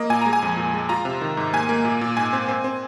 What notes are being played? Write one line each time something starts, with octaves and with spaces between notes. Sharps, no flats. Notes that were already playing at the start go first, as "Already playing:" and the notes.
Already playing: A#3 D#5
A#2 G#5
G#3 A#5
G#5
F2
A#2
G#3
F4 A#5
C3
D#3
G#2
A#3 G#5
A#3
A#2
A#2
G#2 G#5
C4
C4
C4